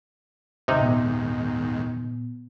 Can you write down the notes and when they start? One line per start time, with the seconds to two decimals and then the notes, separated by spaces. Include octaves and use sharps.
0.68 D#2 G#2 C3 D#4
0.81 A#2 B3